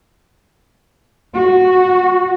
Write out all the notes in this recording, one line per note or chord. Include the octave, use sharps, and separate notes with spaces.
F#4